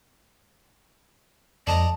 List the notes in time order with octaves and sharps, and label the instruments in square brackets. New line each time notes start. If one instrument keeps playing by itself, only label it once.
[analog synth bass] F2 [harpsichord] D5 D#5 A#5 [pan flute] A5